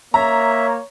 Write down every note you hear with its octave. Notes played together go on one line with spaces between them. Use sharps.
A#3 C#5 E5 A#5